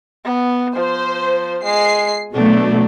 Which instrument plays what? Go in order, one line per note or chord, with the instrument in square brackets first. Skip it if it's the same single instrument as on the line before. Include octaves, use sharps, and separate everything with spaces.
[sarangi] B3
[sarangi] F3 [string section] C5
[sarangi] G#3 [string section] C7
[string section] B2 F#3 A3 [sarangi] D4